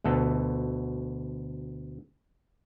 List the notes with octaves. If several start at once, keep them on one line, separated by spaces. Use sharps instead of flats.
D2 B2 A4